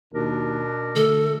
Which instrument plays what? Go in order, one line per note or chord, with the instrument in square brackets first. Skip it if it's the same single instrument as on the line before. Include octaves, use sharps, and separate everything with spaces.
[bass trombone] D#2 [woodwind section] B2 D4 A#4
[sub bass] D3 [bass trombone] A3 [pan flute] A4